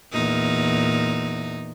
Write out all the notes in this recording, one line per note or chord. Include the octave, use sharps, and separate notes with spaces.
E2 A#2 D#4